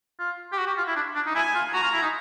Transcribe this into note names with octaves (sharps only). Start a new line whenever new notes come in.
F4
G4
F#4
G4
F4
E4
D4
D4
D#4
E4 G#5
F4
F#4 A#5
F4
E4
D#4